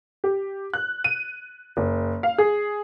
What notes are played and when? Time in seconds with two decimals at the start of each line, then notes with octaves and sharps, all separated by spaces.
0.24 G4
0.74 F#6
1.04 D#7
1.77 F#1
2.23 F5
2.38 G#4